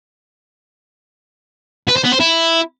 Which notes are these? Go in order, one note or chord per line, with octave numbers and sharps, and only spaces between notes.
B4
C5
B3
C5
E4